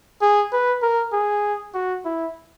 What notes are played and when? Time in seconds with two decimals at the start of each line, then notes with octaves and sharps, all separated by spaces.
0.21 G#4
0.52 B4
0.82 A#4
1.13 G#4
1.74 F#4
2.05 E4